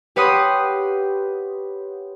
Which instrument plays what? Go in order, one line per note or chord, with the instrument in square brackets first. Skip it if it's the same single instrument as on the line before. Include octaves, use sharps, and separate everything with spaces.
[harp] G4 B4 C#5 F#5 C6 D#6